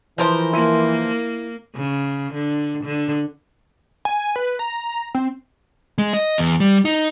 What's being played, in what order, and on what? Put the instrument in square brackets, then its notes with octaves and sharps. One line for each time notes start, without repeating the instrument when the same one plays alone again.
[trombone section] E3 [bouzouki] F3 A#4 C5
[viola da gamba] A#3 [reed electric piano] E4
[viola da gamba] C#3
D3
D3
[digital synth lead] G#5
B4
A#5
C4
[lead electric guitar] G#3
D#5
E2
G3
D#4